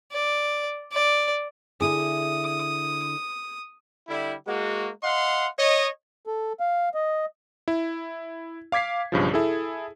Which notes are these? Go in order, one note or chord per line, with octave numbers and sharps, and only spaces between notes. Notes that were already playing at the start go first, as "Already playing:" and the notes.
D5
D5
D3 E4 G#4 D#6
D3 G3 E4
G#3 A#3 F#4
D#5 F5 F#5 C6
C#5 D#5
A4
F5
D#5
E4
F5 D6 G#6 B6 C7
B1 G2 C#3 F3
E4 G#4 A4